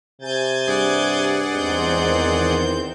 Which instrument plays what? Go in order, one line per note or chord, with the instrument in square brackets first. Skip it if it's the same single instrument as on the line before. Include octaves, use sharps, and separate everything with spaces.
[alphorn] C3 [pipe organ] G#5 G6 A6
[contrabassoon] G2 [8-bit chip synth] G#4 D5 F#5
[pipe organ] E2 C4 G6 [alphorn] G#2
[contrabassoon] D#3